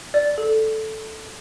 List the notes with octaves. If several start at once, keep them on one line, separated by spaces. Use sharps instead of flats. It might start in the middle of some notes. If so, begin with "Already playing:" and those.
D5
A4